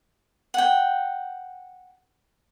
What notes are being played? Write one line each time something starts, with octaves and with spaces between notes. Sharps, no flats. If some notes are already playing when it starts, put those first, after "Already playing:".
F#5 G5